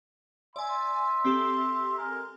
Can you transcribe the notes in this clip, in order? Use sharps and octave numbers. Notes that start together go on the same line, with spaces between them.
D5 E5 G#5 C6
C4 G4 A4
G#3 A#4